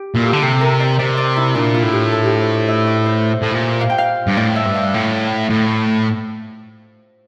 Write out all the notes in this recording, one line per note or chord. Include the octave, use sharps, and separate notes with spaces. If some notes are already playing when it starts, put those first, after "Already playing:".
Already playing: G4
A#2 E4
A4
D3 G4
C3 A4
A#4
D5
C3 D5
D5
E4
A#2 D4
F4
A2
G4
A4
G4
C5
D5
E5
D5
C5
A2
A#2
F5
G5
F5
G2
A2 D5
E5
G2
F5
A2
A2